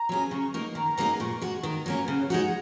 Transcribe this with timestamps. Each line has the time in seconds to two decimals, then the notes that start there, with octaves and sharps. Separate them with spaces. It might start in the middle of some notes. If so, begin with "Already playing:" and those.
Already playing: A#5
0.09 F#3 C#4 G#4
0.31 C#3 C#6
0.50 A#5
0.53 A#3 D#4 C#6
0.75 D#3 A#5
0.97 F#3 A#3 D#4 G#4
1.20 A#2 C#6
1.41 G#3 F#4 C#6
1.63 D#3 A#5
1.86 F#3 A#3 C#4
2.08 C#3 F#5
2.19 C#5
2.30 G#3 D#4 F#4 C#5
2.41 F#5